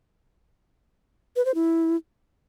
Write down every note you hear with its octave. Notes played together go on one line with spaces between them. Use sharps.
B4
C5
E4